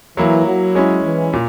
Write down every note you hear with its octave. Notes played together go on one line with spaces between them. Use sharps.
E3 F#3 A#3 E4
F#3
G#3 C#4 E4
E3
A#2